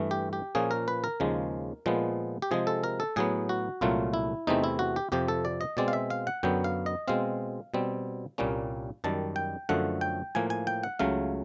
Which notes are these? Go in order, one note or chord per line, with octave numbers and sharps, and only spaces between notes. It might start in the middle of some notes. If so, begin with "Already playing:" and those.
Already playing: G2 E3 A3
G4
G4
A#2 F3 A#3 C#4 G#4
A#4
B4
A#4
D#2 C#3 F3 G#3
A#2 F3 G#3 B3
G4
C3 F3 G#3 G#4
A4
A#4
A4
A2 F#3 B3 G#4
F#4
C2 A#2 F#3 A3 F4
E4
E2 C3 E3 A3 C4 D#4
E4
F#4
G4
F2 C3 F3 G4
A4
D5
D#5
B2 G#3 C4 D5
F5
E5
F5
F#5
F#2 D3 F#3 B3 G5
F5
D#5
B2 G#3 C4 F5
B2 G3 C4
C2 A#2 G3 A#3 C#4
F#2 D#3 G3 A5
G5
F#2 D3 F3 A3 F#5
G5
A2 F3 A#3 G#5
G#5
G5
F#5
C#2 C#3 F#3 A3 F5